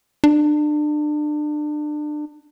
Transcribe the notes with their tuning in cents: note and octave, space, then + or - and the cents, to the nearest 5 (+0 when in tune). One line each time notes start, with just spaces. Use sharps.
D4 +30